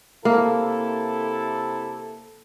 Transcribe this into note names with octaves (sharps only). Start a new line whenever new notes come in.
C3 A#3 E4 A4